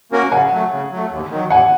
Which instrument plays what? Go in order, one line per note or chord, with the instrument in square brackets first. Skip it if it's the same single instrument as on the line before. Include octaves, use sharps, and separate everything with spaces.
[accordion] A#3 C#4 F#4 A#4
[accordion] C#3 [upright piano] F#5 G#5
[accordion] F#3 A3
C#3
F#3 A3
D#2
D#3 F#3
[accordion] D#2 [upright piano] F#5 G#5